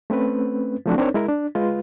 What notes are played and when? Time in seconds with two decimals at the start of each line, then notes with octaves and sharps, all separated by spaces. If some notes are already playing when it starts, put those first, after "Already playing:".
0.10 A3 C4 C#4 B4
0.86 F3 F#3 A3 C4 D4 F#4
0.98 C4 D4 D#4 A#4 C5 C#5
1.14 G#3 E4 A#4
1.29 D4
1.55 G#3 F4 B4